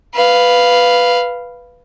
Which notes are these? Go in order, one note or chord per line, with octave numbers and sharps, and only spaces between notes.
B4 F5